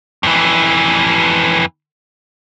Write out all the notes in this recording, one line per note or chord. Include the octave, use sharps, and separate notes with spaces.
F2 E3